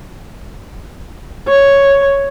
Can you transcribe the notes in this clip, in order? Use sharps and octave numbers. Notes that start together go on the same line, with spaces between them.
C#5